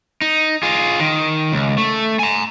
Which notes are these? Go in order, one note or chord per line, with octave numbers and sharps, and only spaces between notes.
D#4
F4 G#4
D#3
C#2
A3
G#5 A#5